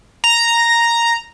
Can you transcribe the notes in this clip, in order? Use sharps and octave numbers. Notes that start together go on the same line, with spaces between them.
A#5